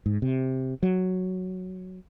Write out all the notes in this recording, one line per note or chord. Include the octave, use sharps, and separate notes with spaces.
G#2
C3
F#3